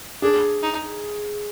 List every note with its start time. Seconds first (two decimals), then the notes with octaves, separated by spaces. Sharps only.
0.22 D4 G#4
0.63 D#4